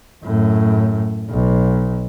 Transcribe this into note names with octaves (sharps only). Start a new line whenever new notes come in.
F#2 A2
B1